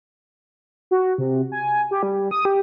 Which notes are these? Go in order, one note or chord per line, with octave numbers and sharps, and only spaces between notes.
F#4
C3
G#5
G4
G3
D#6
G4